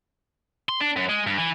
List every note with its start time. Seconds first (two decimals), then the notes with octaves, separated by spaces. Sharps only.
0.69 C6
0.81 D4
0.97 F#2
1.09 G#3
1.27 G2
1.38 E3